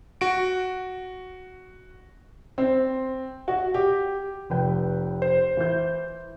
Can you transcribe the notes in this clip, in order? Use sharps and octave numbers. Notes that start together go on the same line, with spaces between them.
F#4 D7
C4
F#4
G4
F1 B4 G5
C5
E3 G6